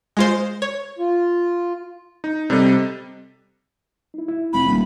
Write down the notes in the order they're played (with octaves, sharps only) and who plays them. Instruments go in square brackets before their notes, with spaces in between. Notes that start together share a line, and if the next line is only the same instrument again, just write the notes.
[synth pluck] G#3 F4 C5
C#5
[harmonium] F4
[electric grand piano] D#4
[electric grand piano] C3 G3 D#5 [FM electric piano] C4 A4
[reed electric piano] D#4 E4
E4
[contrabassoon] F1 [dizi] B5
[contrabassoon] D#1